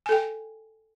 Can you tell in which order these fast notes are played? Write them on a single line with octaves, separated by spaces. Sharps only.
G#5 A4 G5